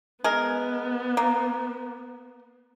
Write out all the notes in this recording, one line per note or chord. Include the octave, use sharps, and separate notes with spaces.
G#3 B3 A#4
A#3